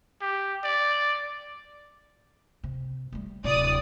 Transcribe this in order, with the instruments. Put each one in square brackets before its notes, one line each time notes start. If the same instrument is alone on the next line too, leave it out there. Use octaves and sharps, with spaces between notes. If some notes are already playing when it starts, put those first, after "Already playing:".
[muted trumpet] G4
D5
[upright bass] C3
G3 A3
[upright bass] D1 C3 [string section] D5 D#6